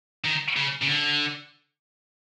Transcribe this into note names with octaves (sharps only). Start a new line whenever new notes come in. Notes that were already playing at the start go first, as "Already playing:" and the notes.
D#3
C#3
C#3
D3